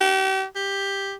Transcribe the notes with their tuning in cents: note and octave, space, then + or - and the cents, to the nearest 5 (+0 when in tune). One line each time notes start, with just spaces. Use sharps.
G4 -35
G4 +10